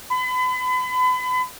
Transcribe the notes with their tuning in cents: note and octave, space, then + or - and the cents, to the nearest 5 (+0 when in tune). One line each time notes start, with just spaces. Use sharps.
B5 +35